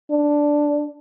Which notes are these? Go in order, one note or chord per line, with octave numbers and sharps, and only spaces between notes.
D4